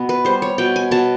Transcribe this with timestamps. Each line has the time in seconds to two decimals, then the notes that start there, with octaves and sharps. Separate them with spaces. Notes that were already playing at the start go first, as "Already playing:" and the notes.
Already playing: B2 B3
0.09 B4
0.25 G3 C5
0.42 C#5
0.58 B2 G5
0.76 G#5
0.91 B2 A5